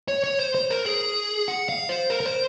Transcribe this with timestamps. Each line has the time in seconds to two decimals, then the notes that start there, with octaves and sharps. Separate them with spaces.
0.08 C#5
0.24 C#5
0.39 C5
0.55 C5
0.70 A#4
0.86 G#4
1.48 F#5
1.69 F5
1.89 C5
2.10 A#4
2.20 A#4
2.25 C5